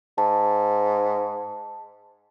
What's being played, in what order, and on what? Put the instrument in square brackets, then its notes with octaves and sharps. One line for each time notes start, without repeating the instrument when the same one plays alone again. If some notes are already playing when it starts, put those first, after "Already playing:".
[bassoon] G#2 [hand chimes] A5